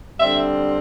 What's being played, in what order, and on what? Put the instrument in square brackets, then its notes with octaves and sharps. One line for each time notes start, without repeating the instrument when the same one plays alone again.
[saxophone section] D3 G3 C4 E5